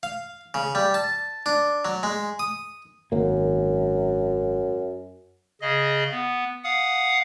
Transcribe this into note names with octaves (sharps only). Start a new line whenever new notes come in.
F5
C#3
G3
A5
D4
F#3
G#3
D#6
G#1 F#2 A#3
C#3 G#4 D#5
B3
F5 F#5 D#6